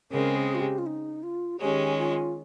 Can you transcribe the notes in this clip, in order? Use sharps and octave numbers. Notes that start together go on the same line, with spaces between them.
C#3 G#3 C4 A#4
G#4
F4
G4
F4
D#4
F4
D#3 G#3 C#4 G4
F4